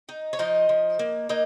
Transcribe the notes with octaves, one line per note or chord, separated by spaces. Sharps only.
D#4
C#5
F3 D#4 D#5
F3
A#3
A#3 D#4 D#5